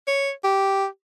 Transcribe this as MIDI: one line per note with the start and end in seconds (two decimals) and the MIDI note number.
0.07 0.31 73
0.44 0.86 67